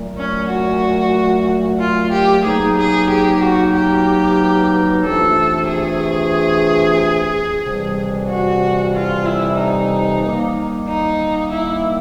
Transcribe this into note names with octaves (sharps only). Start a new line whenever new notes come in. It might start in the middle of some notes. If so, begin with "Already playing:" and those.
Already playing: A#2 F#3 A3
C#4
F#4
F4
G4
B2 F#3 A#3 D#4 G#4
G#4
G4
F#4
G4
C3 E3 A3 D4 F4 A4
G#4
F2 C3 E3 G3
F#4
F4
E4
D#4
D#3 G3 A#3
D#4
E4